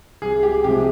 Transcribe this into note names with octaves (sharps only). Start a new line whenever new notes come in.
C2 G#4
G4
C3 F3 G#3 G4